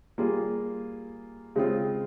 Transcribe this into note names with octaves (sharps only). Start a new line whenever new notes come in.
G3 A#3 F4 G#4
C#3 G#3 C4 F4